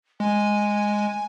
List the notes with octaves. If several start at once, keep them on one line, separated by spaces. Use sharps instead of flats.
G#3 G#5